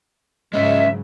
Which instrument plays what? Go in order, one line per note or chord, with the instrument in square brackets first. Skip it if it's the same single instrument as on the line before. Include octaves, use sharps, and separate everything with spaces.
[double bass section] G#2 C#3 F#3 [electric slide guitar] G#3 C#4 [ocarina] D#5 [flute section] E5